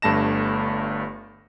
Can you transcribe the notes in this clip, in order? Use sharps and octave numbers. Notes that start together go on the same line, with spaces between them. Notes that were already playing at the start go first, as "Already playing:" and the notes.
G1 G2 A3 A5 A#6 E7